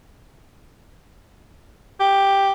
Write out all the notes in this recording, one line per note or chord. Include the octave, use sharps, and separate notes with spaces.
G4